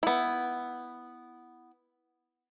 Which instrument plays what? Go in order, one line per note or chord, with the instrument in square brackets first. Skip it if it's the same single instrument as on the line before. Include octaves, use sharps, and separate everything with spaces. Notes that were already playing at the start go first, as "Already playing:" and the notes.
[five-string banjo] B3 E4